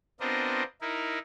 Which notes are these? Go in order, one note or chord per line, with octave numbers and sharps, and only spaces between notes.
B3 C4 D4 F4 A#4 D#5
D#4 E4 A#4